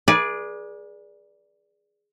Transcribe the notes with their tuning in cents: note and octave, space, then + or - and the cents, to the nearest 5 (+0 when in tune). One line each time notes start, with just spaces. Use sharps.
G#4 +0 B4 -40 D5 +0